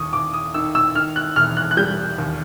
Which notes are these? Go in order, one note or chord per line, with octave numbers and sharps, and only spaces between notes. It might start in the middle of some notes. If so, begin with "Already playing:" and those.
Already playing: D#2 C#6 D#6
D#2 D6
D#6
D#3 E6
E6
D#3 F6
F#6
E1 F6
F#6
F#6
G3 G6
D#2